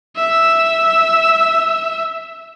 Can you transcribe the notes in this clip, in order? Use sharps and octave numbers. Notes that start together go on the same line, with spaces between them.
E5 E6